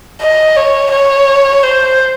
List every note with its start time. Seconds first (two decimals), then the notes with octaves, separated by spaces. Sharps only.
0.22 D#5
0.57 C#5
0.92 C#5
1.63 C5